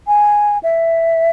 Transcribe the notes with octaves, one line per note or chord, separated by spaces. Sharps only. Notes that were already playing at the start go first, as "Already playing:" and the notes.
G#5
E5